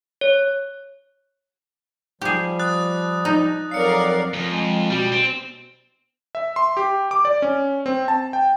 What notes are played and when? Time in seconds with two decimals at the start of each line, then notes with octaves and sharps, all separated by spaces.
0.21 C#5
2.21 F3 G3 G4 G#4
2.59 D#6 F#6 A6
3.25 D#4
3.71 F2 F#3 A#4 D5 F5 C7 C#7
4.34 F2
4.52 G#3
4.90 B2 G3
5.12 C4
6.35 E5
6.56 C6
6.77 G4
7.11 D6
7.25 D5
7.42 C#4
7.86 C4
8.08 A5
8.33 G5